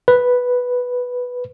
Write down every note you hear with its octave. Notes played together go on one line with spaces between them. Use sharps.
B4